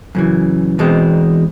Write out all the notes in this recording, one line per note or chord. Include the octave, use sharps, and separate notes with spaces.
F#2 C#3 E3
E2 B2 G#3 C4